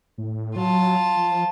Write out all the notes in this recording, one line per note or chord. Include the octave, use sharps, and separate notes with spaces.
A2
F#3 F4 A5
F3